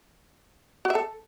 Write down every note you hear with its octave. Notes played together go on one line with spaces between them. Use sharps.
F#4
E5
A4